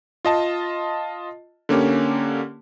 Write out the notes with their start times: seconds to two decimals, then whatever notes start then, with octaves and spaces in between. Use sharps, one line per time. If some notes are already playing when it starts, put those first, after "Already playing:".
0.25 F4 D#5 A5
1.69 D3 A#3 C#4 G4